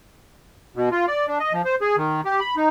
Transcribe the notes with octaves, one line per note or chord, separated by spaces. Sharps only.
B2
F4
D5
D4
D#5
F3
C5
G#4
D#3
G4
B5
D#4